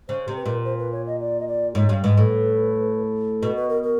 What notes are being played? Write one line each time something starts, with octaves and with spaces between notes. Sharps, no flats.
C#3 C5
C3
B4
A#2
C5
B4
C#5
D#5
D5
D#5
D5
G#2 C#5
G2
G#2 B4
A2
B2 B4
B4
A#4
A#4